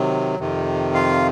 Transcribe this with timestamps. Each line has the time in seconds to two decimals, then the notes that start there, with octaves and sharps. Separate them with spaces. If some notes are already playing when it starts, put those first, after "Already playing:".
Already playing: C3 D#3 F#3
0.40 F2 C3 D#3
0.94 F4 F5